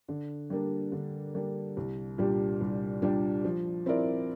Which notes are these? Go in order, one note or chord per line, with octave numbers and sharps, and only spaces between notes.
D3
G3 A#3 D4
D3
G3 A#3 D4
C2
A#2 G3 D4 G4
C2
A#2 G3 D4 G4
F3
C4 E4 A#4 D5